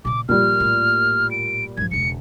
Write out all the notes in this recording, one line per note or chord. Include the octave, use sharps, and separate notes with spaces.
A#2 C#3 D6
A#2 F3 G3 F6
A2
D7
G#1 F3 G#6
E1 C#2 C#7